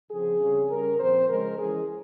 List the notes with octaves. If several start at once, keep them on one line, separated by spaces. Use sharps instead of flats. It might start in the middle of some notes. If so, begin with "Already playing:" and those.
C#3 F3 C4 G#4
C#3 G3 C4
C#3 G3 C#4 A#4
A#2 F3 C4 C5
C#3 F3 G#3 C#4 A#4
E3 G#3 C#4 G#4